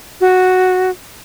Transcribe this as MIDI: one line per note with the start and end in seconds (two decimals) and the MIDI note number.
0.21 0.90 66